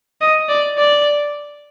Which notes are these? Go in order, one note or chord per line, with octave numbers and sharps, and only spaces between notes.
D#5
D5
D5